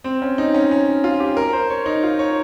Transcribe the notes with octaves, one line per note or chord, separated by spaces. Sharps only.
C4
C#4
D#4
C#4
C#4
F4
G4
A#4
C5
C#5
D#4
F4
C#5